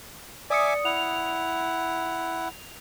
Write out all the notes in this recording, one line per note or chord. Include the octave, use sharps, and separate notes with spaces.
D5 E5 G#5 D6 D#6 C#7
E4 F#5 F7